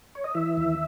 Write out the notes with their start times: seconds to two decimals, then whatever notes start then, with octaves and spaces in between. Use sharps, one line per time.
0.15 C#5
0.24 D#5
0.35 E3 E5
0.57 D#2